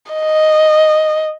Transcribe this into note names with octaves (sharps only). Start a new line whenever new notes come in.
D#5